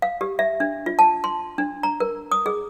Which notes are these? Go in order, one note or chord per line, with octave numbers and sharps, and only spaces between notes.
F5
G4
E5
D4
F4
A5
C6
D4
A#5
A#4
D#6
G#4